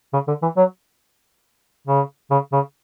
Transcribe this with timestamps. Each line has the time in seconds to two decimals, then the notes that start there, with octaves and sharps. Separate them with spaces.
0.13 C#3
0.27 D3
0.42 E3
0.57 F#3
1.87 C#3
2.30 C#3
2.52 C#3